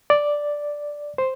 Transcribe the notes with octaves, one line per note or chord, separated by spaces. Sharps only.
D5
C5